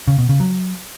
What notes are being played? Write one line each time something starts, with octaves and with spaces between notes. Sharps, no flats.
C#3
B2
C#3
F#3